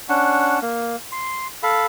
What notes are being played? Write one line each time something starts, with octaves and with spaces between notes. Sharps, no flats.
C#4 D4 F#5
A#3
C6
A4 F5 B5